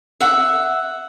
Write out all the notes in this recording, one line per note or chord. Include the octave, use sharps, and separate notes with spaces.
E5 F#5